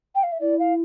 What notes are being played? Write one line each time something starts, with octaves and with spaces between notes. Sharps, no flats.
G5
F5
E5
E4 D5
F5